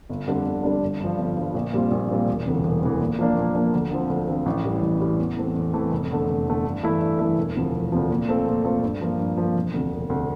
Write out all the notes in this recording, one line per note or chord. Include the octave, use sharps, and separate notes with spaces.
G1
F2 D3 G3 D4
G1
F2 D3 G3 D4
G1
G2 F3
G1
G2 F3
A#1
A#2 G3 C4 F4
A#1
A#2 G3 C4 F4
E1
D2 C3 E3
E1
D2 C3 E3
A#2
F3 A#3 D4
A#2
F3 A#3 D4
D2
D3 F3 C4
D2
D3 F3 C4
A1
A2 E3 G3
A1
A2 E3 G3
E2
E3 A3 C4
E2
E3 A3 C4
F1
E2 D3 A3
F1
E2 D3 A3
G2
E3 A3 E4
G2
E3 A3 E4
E1
D2 C3 F3
E1
D2 C3 F3
A#2
A3 C4 F4 A4
A#2
A3 C4 F4 A4
G2
F3 A#3
G2
F3 A#3
E1
D2 C3
E1
D2 C3